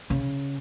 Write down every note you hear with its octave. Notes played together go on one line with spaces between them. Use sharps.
C#3